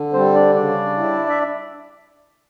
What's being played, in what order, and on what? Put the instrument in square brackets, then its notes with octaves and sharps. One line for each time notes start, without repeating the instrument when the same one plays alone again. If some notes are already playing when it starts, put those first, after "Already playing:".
Already playing: [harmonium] D3
[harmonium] G3 [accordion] C4 C5
[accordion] D4 D5
[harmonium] C#3 [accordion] D4 D5
[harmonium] E4
[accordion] E5